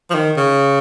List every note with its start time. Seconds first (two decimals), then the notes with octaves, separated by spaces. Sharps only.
0.10 F3
0.14 D#3
0.37 C#3